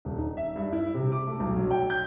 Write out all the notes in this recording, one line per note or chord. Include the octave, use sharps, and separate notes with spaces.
D#1
D#4
E5
G2
E4
C3
D6
A3
B1
F#3
G5
G6